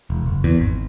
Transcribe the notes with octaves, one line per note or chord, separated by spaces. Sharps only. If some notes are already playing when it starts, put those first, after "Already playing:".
E1
F#1
E2
G#1